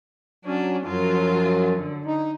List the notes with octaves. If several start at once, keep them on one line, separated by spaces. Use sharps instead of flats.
F#3 C#4 D4
F#2 F3 F#3 F4
D3
D#4